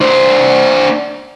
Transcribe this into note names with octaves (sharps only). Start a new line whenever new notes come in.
D4 C5